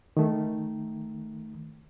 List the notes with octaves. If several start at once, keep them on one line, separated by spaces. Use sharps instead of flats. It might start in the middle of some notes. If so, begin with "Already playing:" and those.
D#3 A3